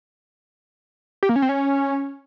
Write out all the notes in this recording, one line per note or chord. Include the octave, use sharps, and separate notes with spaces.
G4
A#3
C#4
C4
C#4